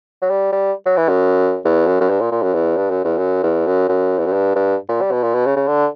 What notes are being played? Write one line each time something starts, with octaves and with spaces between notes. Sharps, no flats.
F#3
G3
G3
F#3
E3
F#2
E2
F#2
F#2
G2
A#2
A#2
F#2
E2
G2
F#2
E2
F#2
E2
F#2
F#2
E2
F#2
G2
G2
A#2
G3
B2
A#2
B2
C#3
C#3
D3